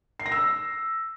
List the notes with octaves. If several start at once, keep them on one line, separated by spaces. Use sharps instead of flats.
C7
A#6
E6